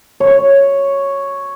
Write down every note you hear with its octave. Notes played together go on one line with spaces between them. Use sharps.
C#5